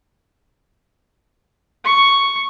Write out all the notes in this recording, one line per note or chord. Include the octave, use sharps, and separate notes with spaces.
C#6